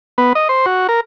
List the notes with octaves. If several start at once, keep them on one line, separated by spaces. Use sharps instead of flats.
B3
D#5
C5
F#4
A#4